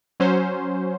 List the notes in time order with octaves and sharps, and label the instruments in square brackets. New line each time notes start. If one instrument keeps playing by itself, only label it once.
[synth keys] F#3 C#4 C5